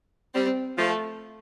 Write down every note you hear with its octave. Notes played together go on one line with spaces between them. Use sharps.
G3 C4
F3 A3